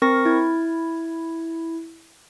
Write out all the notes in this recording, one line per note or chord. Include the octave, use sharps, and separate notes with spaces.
C4 A#4 C#6 A#6
E4 G#6